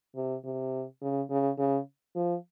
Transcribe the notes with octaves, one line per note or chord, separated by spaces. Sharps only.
C3
C3
C#3
C#3
C#3
F3